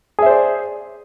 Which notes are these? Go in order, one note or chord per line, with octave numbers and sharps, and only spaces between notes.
G#4 C5 D5 E5